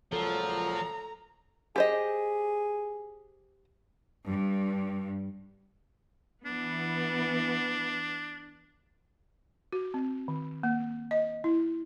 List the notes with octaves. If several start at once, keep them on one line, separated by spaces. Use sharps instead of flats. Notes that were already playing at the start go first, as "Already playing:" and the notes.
C#2 A#2 F3 F#3 A4 A#5
G4 G#4 C5 D#5
G2
E3 B3 D4
F#4
C4
D#3
A#3
D#5
E4